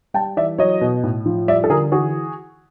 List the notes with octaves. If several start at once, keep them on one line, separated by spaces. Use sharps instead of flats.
G3 G5 A5
E3 D5 E5
F#3 C#5 D#5
B2
A2
F3
G3 D5 E5
A4
D3 G#4 A#4
E3 F#4 G#4